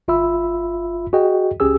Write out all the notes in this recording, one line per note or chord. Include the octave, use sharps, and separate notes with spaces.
G1 F4 E5 B5 E6
F#4 G#4 D#5 G5
C#2 C#4 G4 G#4 E6